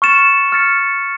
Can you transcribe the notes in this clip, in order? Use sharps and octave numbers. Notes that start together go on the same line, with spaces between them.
C#6 F6 A6 C#7 E7
F6 A6 C#7